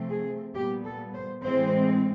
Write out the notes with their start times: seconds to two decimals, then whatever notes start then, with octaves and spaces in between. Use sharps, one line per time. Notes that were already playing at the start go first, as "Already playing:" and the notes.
Already playing: C3 F3 A3 C4
0.10 G#4
0.55 A#2 G3 B3 G4
0.85 A4
1.14 C5
1.43 A2 E3 G#3 C4 C5